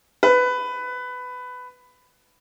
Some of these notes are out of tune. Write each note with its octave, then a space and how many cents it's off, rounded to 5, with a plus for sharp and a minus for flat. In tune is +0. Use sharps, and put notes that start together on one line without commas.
B4 +15